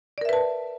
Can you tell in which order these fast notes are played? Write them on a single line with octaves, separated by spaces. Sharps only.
D5 A#4 E5 B4 A5